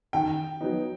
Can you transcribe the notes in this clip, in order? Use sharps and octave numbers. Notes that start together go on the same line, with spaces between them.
D#3 G5
F#3 B3 D#4